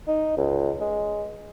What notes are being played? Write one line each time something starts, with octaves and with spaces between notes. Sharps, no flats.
D#4
C#2
G#3